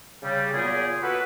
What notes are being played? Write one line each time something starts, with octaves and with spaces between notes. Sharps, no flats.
C#3 G3
A#2 F#3 B3 F4 G4 G#4
F#4 A4 B4